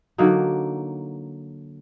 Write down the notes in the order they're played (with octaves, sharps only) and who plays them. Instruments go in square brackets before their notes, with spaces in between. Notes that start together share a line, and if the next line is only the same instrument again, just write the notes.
[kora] D3 F#3 A#3 D#4